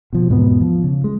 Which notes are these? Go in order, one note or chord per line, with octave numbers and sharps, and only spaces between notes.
B2 F3
E2 G#2 B2 B3
F3
C#3
G#3